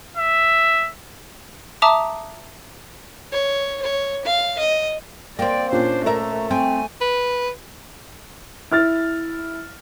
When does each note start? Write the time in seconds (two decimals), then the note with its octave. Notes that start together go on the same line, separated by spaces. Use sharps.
0.17 E5
1.82 E5 A5 A#5 D6 D#6
3.32 C#5
3.82 C#5
4.25 F5
4.59 D#5
5.39 A#3 C4 D5 G5
5.72 A#2 C#4 D4 C5
6.06 A3 A#4 D5 E5 A#5
6.51 C4 G#5
7.01 B4
8.71 E4 F6 A6